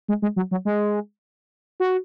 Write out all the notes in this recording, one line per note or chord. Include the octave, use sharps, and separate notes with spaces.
G#3
G#3
F#3
F#3
G#3
F#4